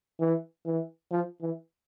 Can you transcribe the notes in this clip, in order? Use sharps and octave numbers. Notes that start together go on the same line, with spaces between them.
E3
E3
F3
E3